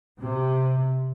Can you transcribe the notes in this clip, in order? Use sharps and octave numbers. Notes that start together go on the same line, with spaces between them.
C3